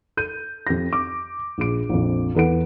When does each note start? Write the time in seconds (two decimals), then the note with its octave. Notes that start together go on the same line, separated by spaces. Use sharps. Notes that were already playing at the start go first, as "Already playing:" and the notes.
0.17 A4 G6 D#7
0.67 F2 G4 A#6
0.93 D6
1.58 A#1 G#4 D7
1.89 A#1 F2
2.35 E2 E3 A4 B4 F#5 D7